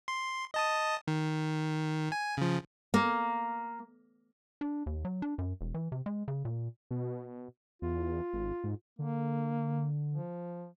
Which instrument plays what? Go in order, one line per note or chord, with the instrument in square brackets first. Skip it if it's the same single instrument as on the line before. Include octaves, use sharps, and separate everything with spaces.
[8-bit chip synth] C6
D#5 A5 D#6
D#3
G#5
C#3 F3
[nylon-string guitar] A#3
[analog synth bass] D4
D#2
F#3
D4
F#2
E1
E3
C3
G#3
C#3
A#2
[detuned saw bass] B2
[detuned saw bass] E2 [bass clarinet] F4
[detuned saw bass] G#1
G#2
[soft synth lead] D3 [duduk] A#3
[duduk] F3